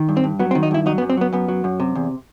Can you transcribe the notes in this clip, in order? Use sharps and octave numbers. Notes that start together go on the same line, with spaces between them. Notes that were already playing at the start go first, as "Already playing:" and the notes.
Already playing: D#3
G2
C4
G2
F#3 B3
C4
D#3
D#4
G2 E4
F#3 D#4
B3
F#2
C4
F#3 B3
F#2 B3
F#3
F#2
C3
E2